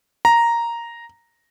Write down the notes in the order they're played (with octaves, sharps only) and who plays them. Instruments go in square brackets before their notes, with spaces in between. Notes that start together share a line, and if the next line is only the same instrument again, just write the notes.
[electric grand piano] A#5